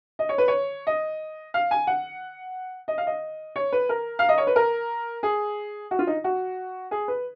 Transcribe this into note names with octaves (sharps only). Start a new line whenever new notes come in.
D#5
C#5
B4
C#5
D#5
F5
G#5
F#5
D#5
F5
D#5
C#5
B4
A#4
F5
D#5
C#5
B4
A#4
G#4
F#4
F4
D#4
F#4
G#4
B4